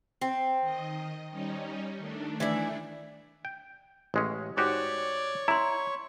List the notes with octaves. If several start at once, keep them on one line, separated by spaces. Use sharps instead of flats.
C4
D#3 D#5
G3 C#4 D#4
D#3 A3 D4
E3 E4 D5
G5
A1 G#3 C#4
G#2 F#4 G4 C#5 D5 C#6
E4 A#5 C6